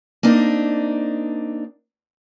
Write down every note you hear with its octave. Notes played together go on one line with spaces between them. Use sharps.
A#3 C4 D4 D#4